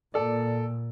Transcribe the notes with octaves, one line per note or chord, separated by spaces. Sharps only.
A#2 A4 D5